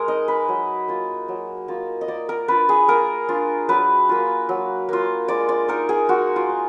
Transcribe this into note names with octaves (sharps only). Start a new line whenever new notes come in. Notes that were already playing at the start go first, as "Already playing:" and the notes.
Already playing: G#3 G#4 A#4
D#4 D#5
B4
F#3
A#3 F4
F#3
A#3 F4
D#5
A#3 D5
A#4
D4 F4 B4
G#4
A#3 A#4
D4 F4
F#3 B4
A#3 F4
F#3
A#3 F4
G#3 D5
D5
D#4 A#4
G#4
G#3 F#4
F4
D#4